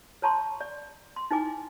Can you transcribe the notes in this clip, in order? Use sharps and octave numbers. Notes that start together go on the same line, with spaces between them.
B4 C#5 A5 A#5 C6 C#6
D5
C6
D#4 E4 B4 G#5 D6